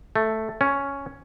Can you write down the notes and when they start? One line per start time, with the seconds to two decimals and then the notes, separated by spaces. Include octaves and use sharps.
0.16 A3
0.61 C#4